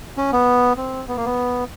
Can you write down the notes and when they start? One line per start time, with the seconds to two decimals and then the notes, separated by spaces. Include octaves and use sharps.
0.17 C#4
0.32 B3
0.77 C4
1.08 B3
1.17 A#3
1.25 B3